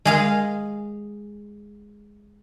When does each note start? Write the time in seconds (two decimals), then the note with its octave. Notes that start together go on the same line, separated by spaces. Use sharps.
0.05 G#3 G#4 F5